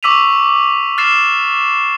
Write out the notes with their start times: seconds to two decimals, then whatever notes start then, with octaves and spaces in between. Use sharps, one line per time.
0.03 C#6 D6 E6 B6 D#7 F7
0.98 F6 A6 C7 E7